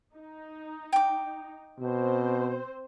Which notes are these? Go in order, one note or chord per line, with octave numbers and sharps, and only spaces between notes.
D#4
G5 D6
B2 C4 C5